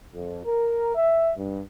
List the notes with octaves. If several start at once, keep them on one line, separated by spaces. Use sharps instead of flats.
F2
A#4
E5
G2